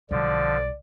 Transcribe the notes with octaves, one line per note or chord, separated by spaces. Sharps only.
B1 D3 F3 G3 D5